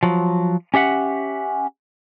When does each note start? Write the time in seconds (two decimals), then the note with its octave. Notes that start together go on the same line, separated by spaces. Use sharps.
0.03 F3 F#3
0.74 C#4 G4 E5 F#5